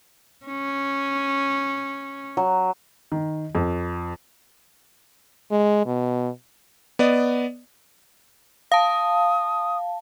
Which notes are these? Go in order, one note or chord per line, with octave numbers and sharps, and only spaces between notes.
C#4
F#3
D#3
F2
G#3
B2
B3 D5 D#5
F5 A5 D#6